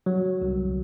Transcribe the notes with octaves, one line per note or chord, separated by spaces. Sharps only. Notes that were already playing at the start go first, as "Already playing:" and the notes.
F#3
C2